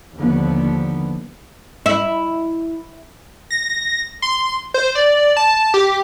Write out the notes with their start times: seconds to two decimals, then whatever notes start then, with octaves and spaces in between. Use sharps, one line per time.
0.16 D#2 D3 F3 B3
1.86 E4
3.51 A#6
4.22 C6
4.74 C5
4.95 D5
5.37 A5
5.74 G4